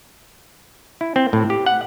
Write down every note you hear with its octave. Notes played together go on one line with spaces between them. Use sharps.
E4
C4
A2
G4
F#5